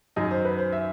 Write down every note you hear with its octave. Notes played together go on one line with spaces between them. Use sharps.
F#2 D#3 D#5
C5
B4
C5
E5